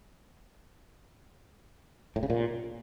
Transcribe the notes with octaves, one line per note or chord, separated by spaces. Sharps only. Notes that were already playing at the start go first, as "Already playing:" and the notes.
A2
C#3
A#2